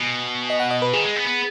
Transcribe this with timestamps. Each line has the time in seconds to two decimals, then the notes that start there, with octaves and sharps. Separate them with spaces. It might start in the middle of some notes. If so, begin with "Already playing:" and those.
Already playing: B2 G#5
0.50 D#5
0.60 F#5
0.71 D#5
0.82 B4
0.93 D#3 G#4
1.04 G#3
1.16 B3
1.27 B3